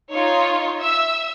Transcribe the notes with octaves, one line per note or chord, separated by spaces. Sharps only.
D#4 F4 C#5
E5 E6